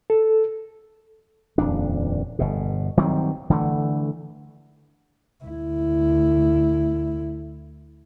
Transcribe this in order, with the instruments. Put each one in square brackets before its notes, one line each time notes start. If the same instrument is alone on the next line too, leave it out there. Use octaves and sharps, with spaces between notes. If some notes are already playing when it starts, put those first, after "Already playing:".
[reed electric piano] A4
[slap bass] D#1 F2 D4
G1 B2
D#3 F#3 G3 C4
D3 E3 A3
[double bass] D2 E4